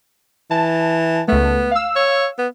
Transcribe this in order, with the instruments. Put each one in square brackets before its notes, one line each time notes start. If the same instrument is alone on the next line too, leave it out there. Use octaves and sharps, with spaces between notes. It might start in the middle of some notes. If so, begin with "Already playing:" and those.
[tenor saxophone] E3 [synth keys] A5
[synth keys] C#2 A3 [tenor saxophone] B3
[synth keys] F5 E6
[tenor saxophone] C#5
B3